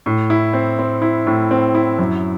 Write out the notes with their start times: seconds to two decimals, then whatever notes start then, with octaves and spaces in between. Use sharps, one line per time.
0.06 A2
0.30 E4
0.53 C4
0.79 C4
1.02 E4
1.26 A2
1.51 C4
1.75 E4
1.98 F#2